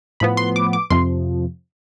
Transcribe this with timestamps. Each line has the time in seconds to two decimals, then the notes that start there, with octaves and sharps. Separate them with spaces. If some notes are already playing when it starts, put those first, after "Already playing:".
0.20 A2 F3 B3 B5
0.37 C6
0.56 D6
0.73 D6
0.90 F2 C3 F3 C6